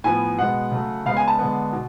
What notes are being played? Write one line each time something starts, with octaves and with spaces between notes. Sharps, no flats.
A2 F3 B3 G#5
B2 G#3 B3 F#5
C#3 F#3 A3
C#3 G#3 B3 F5
G#5
A5
D3 G#3 B3
B2